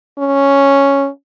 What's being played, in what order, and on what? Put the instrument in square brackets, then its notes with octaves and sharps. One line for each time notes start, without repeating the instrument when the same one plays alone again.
[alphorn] C#4